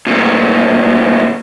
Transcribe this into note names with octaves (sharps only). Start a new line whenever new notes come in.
D2 A#2